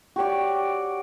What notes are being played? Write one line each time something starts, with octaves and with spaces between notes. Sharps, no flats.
F#4 G4 C#5 D5